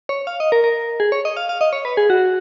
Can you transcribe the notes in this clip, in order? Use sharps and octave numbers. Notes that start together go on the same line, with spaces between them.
C#5
F5
D#5
A#4
A#4
G#4
C#5
D#5
F5
F5
D#5
C#5
B4
G#4
F#4